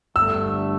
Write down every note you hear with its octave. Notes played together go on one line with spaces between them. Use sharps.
G1 G2 D3 A3 E6